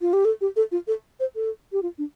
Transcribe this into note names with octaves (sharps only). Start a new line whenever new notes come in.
F4
G4
A4
G4
A4
F4
A4
C5
A4
G4
F4
D4